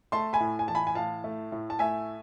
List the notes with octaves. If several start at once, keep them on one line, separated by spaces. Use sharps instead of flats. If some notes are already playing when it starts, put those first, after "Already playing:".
A3 A5 C6
G#5 B5
A2
G#5
E3 A5
G#5 B5
G#5
A2 F5 A5
A3
A2
A5
A3 E5 G#5